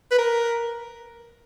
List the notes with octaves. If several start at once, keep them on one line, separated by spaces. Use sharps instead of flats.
B4
A#4